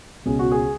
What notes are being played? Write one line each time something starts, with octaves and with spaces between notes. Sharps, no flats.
C#2 B2 G#3 C#4 G#4
F#4
G#4